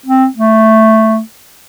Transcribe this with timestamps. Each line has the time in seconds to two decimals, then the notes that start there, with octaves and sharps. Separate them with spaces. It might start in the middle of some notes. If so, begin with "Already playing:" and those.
0.06 C4
0.36 A3